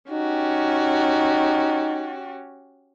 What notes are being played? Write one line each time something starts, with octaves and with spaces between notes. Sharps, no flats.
C#4 D#4 F#4 G4